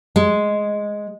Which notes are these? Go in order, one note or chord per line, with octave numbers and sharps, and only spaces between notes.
G#3